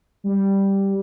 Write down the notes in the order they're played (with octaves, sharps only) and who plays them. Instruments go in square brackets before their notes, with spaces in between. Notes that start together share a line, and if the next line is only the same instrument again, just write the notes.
[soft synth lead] G3